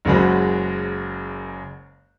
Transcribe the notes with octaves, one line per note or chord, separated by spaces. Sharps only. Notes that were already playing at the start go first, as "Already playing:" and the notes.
F#1 F#2 G#3 F#4 C5 B5